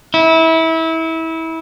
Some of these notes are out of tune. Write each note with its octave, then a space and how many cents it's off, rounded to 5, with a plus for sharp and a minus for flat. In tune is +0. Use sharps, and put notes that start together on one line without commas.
E4 -25